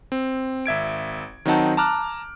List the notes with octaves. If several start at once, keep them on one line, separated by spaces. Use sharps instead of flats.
C4
G#1 E5 G#6 D7
D#3 F#3 C4 D#4 F#5 A5
A5 A#5 D6 F6 F#6